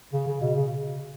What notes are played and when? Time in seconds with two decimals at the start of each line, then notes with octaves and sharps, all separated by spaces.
0.13 C#3
0.26 C#3
0.41 B2
0.55 C#3